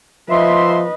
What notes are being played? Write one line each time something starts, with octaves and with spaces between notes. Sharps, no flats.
F3 B4 D#5 E5 C6